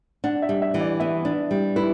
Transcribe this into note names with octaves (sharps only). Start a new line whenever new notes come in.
D4 F#5
E5
G3
E5
E3
D5
B3 E5
D4
G3
E4 B4